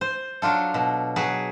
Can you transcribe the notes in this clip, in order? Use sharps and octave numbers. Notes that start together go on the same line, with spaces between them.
C5
F#3 D4 F4 A4
B2
F#3 G#4 B4